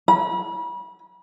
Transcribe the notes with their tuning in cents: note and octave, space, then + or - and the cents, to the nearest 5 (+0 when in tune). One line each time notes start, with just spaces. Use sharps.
B5 -35